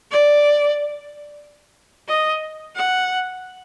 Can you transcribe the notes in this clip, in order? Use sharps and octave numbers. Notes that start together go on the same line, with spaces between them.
D5
D#5
F#5